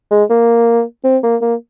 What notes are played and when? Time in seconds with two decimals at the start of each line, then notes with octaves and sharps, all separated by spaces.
0.11 G#3
0.30 A#3
1.04 C4
1.23 A#3
1.41 A#3